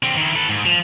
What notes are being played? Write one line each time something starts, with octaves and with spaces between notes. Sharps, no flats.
D3 C4
D#3 E4
A4 B4
G#2
F3